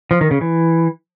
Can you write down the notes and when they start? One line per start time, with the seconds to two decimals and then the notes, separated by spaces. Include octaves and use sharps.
0.11 F3
0.21 D#3
0.31 C#3
0.41 E3